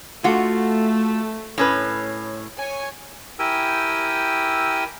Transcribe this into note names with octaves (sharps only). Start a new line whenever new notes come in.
A3 F4 F#4
A2 C#4 B4
C#5 G#5
E4 G4 A#4 G5 G#5 E6